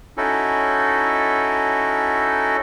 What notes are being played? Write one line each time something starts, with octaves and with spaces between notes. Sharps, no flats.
C#4 D#4 E4 F#4 A4